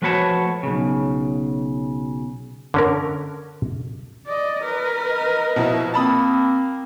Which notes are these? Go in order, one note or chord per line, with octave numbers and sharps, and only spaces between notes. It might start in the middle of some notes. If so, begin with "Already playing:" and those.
F3 A3 F#4 B4 C#5 A5
B1 C#3
D3 C#4 A#4
D5 D#5
A#4 B4
D#5
B2 F3 E4
A#3 C4 A5 B5 D#6